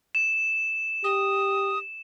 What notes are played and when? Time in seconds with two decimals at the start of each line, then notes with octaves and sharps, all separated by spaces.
0.15 E7
1.04 G4 D#6